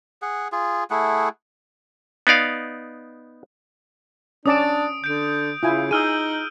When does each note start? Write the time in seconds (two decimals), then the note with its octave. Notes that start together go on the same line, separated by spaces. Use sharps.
0.22 G#4 F#5
0.52 F4 G#4
0.90 A3 E4 G#4 F#5
2.27 B3 D#4 D5 F5
4.46 C#4 D4 D5 A5 D#6 D7
5.04 D3 G6 D7
5.63 C#3 E4 F4 G#5
5.91 D#4 G#4 E6 F6 D#7